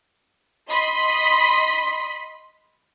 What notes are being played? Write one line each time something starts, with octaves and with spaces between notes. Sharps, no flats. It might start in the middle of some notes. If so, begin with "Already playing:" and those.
D#5 B5 C6 B6